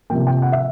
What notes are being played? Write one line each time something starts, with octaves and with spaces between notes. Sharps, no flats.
C3 F3 A#3 G5
G5
F#5
E5